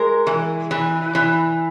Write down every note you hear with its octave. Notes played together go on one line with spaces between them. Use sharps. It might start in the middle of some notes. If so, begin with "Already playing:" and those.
Already playing: G#3 A#4
E3
E3
E3